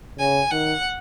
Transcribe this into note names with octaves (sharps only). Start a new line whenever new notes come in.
C#3 G#5
D#3 F#5